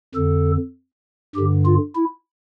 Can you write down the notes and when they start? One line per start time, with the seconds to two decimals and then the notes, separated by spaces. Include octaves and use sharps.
0.15 F2 D3 A4
1.36 G2 D3 G4
1.66 F4
1.96 E4